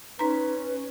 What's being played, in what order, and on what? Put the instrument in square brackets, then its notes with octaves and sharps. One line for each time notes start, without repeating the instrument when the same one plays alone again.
[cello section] C#4 [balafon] D#4 A#5 [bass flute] B4